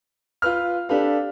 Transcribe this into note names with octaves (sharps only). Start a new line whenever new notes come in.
F4 B4 F6
D4 G4 A4 B4 F5